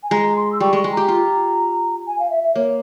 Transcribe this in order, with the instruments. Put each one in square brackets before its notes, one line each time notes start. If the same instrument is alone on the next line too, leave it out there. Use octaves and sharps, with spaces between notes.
[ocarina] G#5
[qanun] G#3 [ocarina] A#5
[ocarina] C6
E6
[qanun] G3 [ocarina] C#6
[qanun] G#3 [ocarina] C#6
[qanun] G#3
[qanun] G4 [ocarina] A#5
[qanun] F4
[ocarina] G#5
F5
E5
E5
[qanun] A#3 [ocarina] C#5